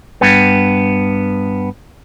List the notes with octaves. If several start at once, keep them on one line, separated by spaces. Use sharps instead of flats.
G2 B3